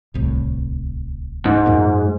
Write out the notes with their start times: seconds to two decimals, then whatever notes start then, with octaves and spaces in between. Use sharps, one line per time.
0.14 D1 C2 A2
1.45 G#2
1.66 F#2 A#2